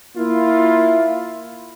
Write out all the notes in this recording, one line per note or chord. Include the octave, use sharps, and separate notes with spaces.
A#3 E4 F4